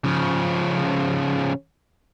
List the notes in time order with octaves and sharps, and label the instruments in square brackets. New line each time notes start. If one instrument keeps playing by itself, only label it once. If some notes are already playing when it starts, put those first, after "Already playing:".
[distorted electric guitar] C#3 F3